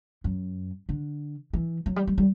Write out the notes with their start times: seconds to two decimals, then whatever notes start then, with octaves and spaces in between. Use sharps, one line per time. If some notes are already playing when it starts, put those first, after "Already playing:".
0.24 F#2
0.89 D3
1.53 E3
1.86 F#3
1.96 G3
2.07 G3
2.18 G3